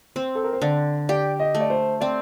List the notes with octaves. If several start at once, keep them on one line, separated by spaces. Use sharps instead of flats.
C4 C5
A4
A#4
C5
D3 D5
G4 D5
D#5
A3
D5
C5
C4 D5